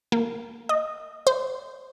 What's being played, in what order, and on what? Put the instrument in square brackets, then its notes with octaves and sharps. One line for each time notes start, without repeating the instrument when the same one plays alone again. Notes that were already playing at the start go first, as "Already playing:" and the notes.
[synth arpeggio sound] A#3
D#5
C5